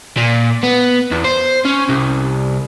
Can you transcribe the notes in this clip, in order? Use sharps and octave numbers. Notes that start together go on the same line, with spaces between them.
A#2
B3
E2
C5
C#4
C2